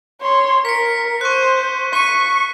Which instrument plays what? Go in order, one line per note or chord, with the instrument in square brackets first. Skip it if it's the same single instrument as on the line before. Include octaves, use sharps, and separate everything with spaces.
[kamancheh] C#5 C6
[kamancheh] A#4 [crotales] B6 C#7
[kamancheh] C5 [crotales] C#6 F#6
[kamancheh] C#6 [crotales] B6 D#7